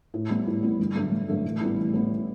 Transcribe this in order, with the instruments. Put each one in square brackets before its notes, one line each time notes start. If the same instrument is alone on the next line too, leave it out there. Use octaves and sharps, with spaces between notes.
[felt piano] A2
G3 B3 E4
A2
G3 B3 E4
G1
G2 F#3 A3 D4
G1
G2 F#3 A3 D4
A1
A2 G3 B3 E4
A1
A2 G3 B3 E4